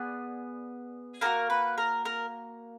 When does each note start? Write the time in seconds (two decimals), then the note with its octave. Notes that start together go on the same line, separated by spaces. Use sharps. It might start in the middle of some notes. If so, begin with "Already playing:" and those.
Already playing: B3 G#4 D5
1.21 A#3 D#4 F#4 A#4
1.50 B4
1.78 A#4
2.05 A#4